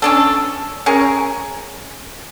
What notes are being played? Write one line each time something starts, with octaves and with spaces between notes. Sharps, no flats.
C#4 D4 A4
C#4 G#4 A#4